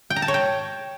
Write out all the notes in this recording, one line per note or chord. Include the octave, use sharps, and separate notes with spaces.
G5
A#5
A5
C#5
G5